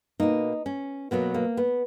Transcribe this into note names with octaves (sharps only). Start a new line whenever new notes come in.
B2 A#3 D#4
C#4
B2 F#3 A#3 B3
A#3
B3